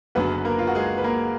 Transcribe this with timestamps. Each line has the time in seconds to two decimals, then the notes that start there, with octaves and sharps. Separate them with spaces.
0.15 F#1 F#2 D3 F#3 B3 B4
0.45 A#3 A#4
0.59 F4
0.67 F#4
0.75 G#3 G#4
0.98 B4
1.04 A#3 A#4